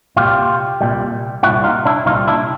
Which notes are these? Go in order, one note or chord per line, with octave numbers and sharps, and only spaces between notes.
C2 A#2 G3 F4 G4
C2 A#2 G3
C2 A#2 G3 E4 F#4
D#4 F4
D4 E4
C2 A#2 G3 D#4 F4
D4 E4